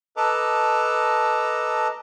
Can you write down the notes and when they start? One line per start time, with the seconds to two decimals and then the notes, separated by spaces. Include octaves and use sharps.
0.17 A4 B4 D#5 A5 A#5 D6